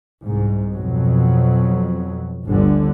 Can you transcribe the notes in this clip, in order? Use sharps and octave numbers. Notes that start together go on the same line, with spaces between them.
C2 G#2
F2 B2 F#3
G1 D2 D3